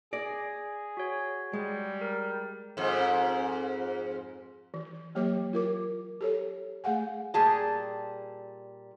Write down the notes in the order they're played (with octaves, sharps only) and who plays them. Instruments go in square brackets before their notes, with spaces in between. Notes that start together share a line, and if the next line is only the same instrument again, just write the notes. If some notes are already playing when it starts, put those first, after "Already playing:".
[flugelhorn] G#4 [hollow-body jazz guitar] D5 [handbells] A#6
[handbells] F#4 C#5
[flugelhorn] G3 [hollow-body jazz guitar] G#3
[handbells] A#4
[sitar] F2 G#2
[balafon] E3
F#3 A#3 G4 C#5 D6
F4 A#4 D6
G4 A4 C#5
A3 G#4 F5 F#5 G#5
[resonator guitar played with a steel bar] A#2 G3 G#4 A5